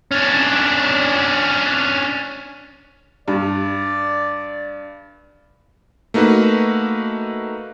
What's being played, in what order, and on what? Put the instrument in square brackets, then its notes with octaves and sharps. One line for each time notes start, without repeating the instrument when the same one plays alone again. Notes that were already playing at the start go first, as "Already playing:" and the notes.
[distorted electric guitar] C#4 D4
[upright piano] G2 [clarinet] D5
[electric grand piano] A3 A#3 D#4 F#4 B4